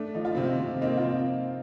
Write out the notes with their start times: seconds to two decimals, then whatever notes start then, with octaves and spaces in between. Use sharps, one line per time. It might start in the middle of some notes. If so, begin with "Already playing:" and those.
Already playing: A3 D4
0.14 F3 D#4
0.25 F4
0.34 C3 C4 D#4
0.60 C3
0.81 A#3 C4 D#4
0.97 F4
1.04 F3 C4 D#4